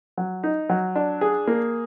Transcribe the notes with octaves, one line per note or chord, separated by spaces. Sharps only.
F#3
D#4
F#3
D4
G#4
A#3